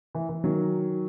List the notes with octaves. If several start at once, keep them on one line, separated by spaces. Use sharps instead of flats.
E3
E3
D#3 F#3